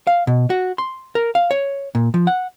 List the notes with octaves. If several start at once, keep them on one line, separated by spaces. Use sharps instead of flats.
F5
B2
F#4
C6
A#4
F5
C#5
A#2
F3
F#5